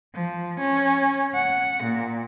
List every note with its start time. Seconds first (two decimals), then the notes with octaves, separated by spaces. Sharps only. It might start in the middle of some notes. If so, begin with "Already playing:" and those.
0.14 F3
0.59 C#4
1.34 F#5
1.83 A#2